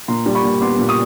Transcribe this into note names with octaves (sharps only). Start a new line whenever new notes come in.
A#2 A#5 C6
G3
B5 C#6
A#2
B3 C6 D6
A#2
C#6 D#6